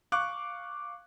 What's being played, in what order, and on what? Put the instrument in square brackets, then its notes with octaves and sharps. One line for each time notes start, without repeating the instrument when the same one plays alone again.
[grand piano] F5 C#6 D6 F#6